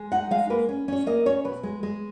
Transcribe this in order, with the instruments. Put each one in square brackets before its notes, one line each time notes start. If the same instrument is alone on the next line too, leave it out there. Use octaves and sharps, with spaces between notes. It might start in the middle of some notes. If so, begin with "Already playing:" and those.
Already playing: [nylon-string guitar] G#3
D#4 F#5
G#3 F5
A#3 B4
C#4
C#4 C#5
A#3 D#5
C#4 C#5
B2 B4
G#3
G#3